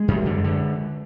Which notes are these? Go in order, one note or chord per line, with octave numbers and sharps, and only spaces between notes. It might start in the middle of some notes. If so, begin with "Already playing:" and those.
Already playing: G#3
F#2
D3
D3